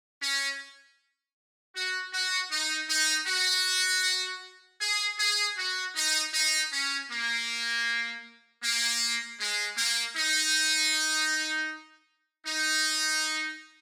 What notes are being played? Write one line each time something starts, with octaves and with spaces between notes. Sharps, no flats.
C#4
F#4
F#4
D#4
D#4
F#4
G#4
G#4
F#4
D#4
D#4
C#4
A#3
A#3
G#3
A#3
D#4
D#4